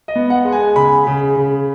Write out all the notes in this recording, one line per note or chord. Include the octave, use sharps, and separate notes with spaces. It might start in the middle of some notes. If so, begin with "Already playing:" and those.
D#5
B3
F#5
G#3
G#5
C#3 B5
C#3
C#3